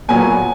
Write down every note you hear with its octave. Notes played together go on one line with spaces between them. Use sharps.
A#2 F#3 B3 G#5